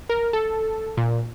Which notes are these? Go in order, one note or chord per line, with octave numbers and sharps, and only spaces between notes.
A#4
A4
A#2